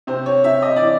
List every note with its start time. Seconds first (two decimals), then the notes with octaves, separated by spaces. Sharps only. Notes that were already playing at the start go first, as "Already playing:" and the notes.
0.07 C3 C5
0.26 C#5
0.44 C3 E5
0.62 D#5
0.76 D5
0.81 E3